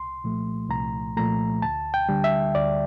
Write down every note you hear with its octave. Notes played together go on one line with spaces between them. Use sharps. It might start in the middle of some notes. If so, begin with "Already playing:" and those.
Already playing: C2 C6
A#2 F3 A3
C2 A#5
A#2 F3 A3 A#5
D2 A5
G5
D3 G3
E5
D2 D5